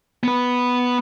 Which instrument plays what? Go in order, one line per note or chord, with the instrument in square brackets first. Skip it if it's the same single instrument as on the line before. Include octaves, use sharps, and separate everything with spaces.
[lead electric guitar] B3 B4